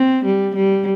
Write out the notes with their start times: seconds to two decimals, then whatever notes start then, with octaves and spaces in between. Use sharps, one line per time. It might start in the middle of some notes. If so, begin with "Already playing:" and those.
Already playing: C4
0.25 G3
0.55 G3